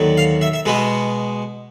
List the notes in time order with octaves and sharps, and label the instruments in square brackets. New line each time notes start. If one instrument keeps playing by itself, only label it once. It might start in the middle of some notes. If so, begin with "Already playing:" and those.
Already playing: [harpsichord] D#2 D3 F#3
F5
E5
E5
B2 G#3 B3